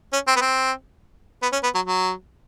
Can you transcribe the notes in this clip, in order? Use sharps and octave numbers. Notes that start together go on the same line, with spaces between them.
C#4
C4
B3
C4
B3
C#4
B3
F#3
F#3